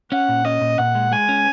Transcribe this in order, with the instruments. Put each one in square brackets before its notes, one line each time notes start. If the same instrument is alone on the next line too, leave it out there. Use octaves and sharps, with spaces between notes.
[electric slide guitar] C#4 [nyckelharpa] F#5
[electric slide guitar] A#2
[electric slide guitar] C#4 [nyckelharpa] D#5
[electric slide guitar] A#2
[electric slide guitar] A#2 [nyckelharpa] F#5
[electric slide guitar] G#3
[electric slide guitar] G#3 [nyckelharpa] G#5
[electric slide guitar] C#4